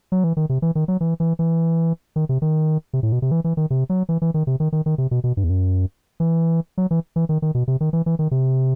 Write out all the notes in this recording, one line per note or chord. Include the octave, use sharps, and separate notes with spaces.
F#3
E3
D#3
C3
E3
D#3
F#3
E3
E3
E3
D#3
C3
D#3
C3
A2
B2
C3
E3
E3
D#3
C3
F#3
E3
E3
D#3
C3
D#3
D#3
D#3
C3
B2
B2
G2
E2
F#2
E3
F#3
E3
E3
D#3
D#3
B2
C3
D#3
E3
E3
D#3
C3